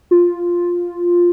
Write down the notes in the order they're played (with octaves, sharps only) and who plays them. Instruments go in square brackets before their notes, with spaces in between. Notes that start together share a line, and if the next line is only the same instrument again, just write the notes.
[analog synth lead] F4